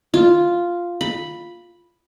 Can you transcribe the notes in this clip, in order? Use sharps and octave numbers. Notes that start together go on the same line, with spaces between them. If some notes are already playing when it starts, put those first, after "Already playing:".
F4
B5